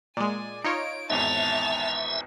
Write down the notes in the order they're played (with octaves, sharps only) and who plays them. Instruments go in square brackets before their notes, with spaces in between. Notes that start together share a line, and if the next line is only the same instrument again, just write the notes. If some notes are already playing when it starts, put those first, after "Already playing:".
[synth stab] A#2 G#3 [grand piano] D5 [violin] G#5
[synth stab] D#4 F4 C#5 [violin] D7
[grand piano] G#1 E2 G#2 [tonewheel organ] E5 [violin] A5 F7